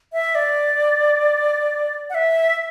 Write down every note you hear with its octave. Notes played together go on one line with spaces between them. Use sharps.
E5
D5
F#5
E5